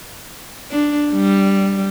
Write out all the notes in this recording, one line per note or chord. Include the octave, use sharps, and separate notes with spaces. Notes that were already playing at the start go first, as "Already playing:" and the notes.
D4
G3